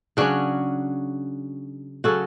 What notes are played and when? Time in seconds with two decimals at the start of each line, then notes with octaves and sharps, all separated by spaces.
0.17 C#3 F#3 C#4 D4 F#4
2.04 C#3 F#3 C#4 F#4 A4